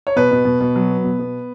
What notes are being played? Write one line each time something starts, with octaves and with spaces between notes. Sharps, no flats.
C#5
B2 B4
B2
B2
B2
F#3
B3
B2
B3